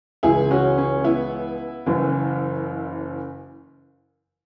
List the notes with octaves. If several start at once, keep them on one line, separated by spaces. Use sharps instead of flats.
C#2 C#3 E3 E4 G#4
C#4 F#4
C#4
B3 E4
F#1 F#2 E3